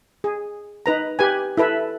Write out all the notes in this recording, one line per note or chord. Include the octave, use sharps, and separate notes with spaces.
G#4
D#4 B4 A#5
G4 B4 G#5
E4 A4 B4 E5